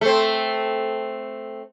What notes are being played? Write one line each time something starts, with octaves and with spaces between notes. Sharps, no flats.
A3 C4